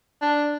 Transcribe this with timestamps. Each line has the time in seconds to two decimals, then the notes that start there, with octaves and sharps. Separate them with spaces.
0.22 D4